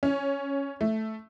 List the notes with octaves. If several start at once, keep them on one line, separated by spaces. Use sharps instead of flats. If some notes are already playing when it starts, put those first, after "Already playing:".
C#4
A3